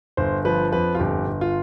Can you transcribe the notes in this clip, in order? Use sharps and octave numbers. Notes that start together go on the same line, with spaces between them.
G1 C5
F3 B4
F2 B4
F4
G1 G4
G1
F4